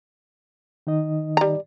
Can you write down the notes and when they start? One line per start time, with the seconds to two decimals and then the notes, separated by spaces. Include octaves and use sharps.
0.87 D#3 D#4 D#5
1.37 G3 A#5